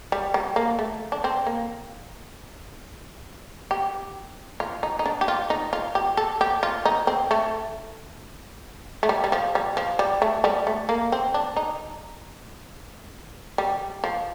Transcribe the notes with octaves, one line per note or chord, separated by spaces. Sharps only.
G3
G3
A#3
A3
D4
C4
A#3
G4
F4
D#4
D#4
D4
G4
F4
D#4
F4
G4
A4
G4
F4
D#4
C4
A3
A3
G3
G3
F3
G3
F3
G3
A3
G3
A3
A#3
C4
D4
D#4
G3
F3